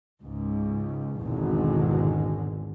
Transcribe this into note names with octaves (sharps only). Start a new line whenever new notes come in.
C#2 G#2
G#1 E2 B2 D3 G#3